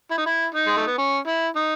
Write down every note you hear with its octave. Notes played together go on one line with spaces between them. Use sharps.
E4
D#4
E4
D#4
G#3
A3
B3
C#4
E4
D#4